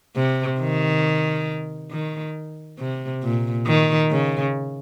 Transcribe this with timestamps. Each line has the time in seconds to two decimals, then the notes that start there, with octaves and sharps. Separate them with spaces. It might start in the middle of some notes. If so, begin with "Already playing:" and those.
0.16 C3
0.60 D#3
1.91 D#3
2.79 C3
3.23 A#2
3.66 D#3
4.11 C#3